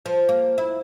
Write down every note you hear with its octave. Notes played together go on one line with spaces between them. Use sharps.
F3
A#3
E4